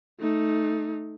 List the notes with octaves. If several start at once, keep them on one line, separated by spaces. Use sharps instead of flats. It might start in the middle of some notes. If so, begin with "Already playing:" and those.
A3 D#4